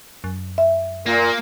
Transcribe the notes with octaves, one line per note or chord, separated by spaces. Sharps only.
F#2
E5
A#2 A#3